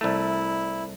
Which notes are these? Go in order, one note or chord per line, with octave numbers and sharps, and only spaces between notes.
C2 A3 E4